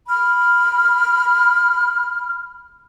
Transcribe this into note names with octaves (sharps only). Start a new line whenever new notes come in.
B5 F6